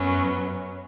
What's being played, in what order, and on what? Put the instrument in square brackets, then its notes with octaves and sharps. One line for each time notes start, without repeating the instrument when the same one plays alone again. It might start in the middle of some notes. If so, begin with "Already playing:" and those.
Already playing: [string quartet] F#2 F#3 B3 [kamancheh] C#4